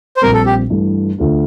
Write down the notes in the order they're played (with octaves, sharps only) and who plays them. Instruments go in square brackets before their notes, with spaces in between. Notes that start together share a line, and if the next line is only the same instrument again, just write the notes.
[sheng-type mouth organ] C5
[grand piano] A#1 A#2 G3 C4 [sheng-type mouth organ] A#4
[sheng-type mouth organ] A4
G4
[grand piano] G2 E3 A3
D2 D3 A3 D4 F4